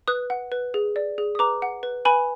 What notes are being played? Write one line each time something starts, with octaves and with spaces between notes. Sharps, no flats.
B4 D#6 F#6
F#5
B4
G#4
D5
G#4
D#6
B4 A#5 D6
F#5
B4
B4 G#5 B5